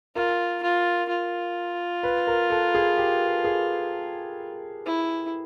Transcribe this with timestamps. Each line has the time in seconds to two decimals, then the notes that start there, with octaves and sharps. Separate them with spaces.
0.15 F4 A#4
0.63 F4
1.09 F4
2.03 B4
2.27 A#4
2.50 A4
2.75 G#4
2.98 G4
3.45 G#4
4.86 E4